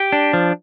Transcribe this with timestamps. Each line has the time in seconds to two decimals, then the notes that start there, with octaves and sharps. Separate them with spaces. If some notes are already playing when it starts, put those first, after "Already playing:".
Already playing: G4
0.12 D4
0.33 F3